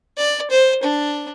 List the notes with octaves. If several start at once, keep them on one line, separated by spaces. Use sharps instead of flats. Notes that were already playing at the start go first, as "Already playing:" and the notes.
D5
C5
D4